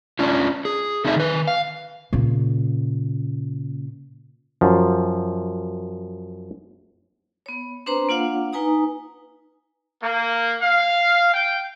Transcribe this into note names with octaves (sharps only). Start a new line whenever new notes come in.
C#4 D4 F4
G#4
A3 C4 D#4 A4 D#5 E5
D#3 B4
F5
A#2 C#3
F#2 F3
B3 C#5
C4 D4 B4 C5 A#5 C6
A#3 D4 F4 C#5 F5 F#5
D#4 B4 G#5 A#5 D#6
A#3
F5
G5